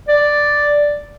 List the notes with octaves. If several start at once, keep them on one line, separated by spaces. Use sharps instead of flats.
D5